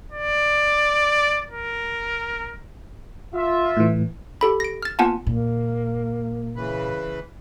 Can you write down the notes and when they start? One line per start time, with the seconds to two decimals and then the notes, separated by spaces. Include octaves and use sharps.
0.12 D5
1.50 A#4
3.35 F4 E5
3.77 A2 E3
4.41 G4 A4 B5
4.60 A#6 D7
4.83 F6 A6
4.99 A#3 B3 F4 F#5 G#5 A5
5.27 A#2 A#3
6.56 C#3 E3 B4